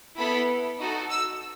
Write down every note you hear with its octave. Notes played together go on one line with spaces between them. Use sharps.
B3 E4 A4 B5
D#4 F#4 A4
E6